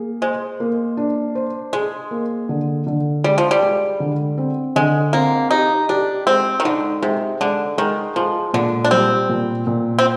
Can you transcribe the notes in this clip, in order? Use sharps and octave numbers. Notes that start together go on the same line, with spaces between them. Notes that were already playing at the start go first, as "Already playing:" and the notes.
Already playing: A#3 G#4
G#3 C5
A#3
D4
C5
G#3 G#4
A#3
D3
D3
G3 G#3
F3
G3
G#3
D3
C4
D3 G#3
A#3 C4
D#4 G4
D4 G4
G#3 C4
D#3
D3 D#4
C3 G#3
D3 G#3
D#3 G#3
F3 G#3
A#2 D3
D4
G3 C4
A#2
A#2
C4